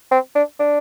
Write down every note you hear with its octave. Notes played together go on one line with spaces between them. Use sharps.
C4
D4
D4